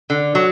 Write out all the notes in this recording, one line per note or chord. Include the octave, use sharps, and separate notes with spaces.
D3
F#3